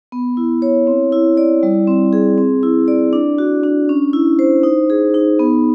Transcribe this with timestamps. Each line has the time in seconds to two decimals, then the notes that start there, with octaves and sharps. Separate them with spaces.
0.12 B3
0.37 E4
0.62 C#5
0.87 C4
1.12 E4
1.37 D5
1.63 G3
1.88 C4
2.13 G#4
2.38 C4
2.63 E4
2.88 D5
3.13 D4
3.38 F#4
3.64 D4
3.89 C#4
4.13 E4
4.39 C5
4.63 D#4
4.90 G#4
5.14 D#4
5.40 B3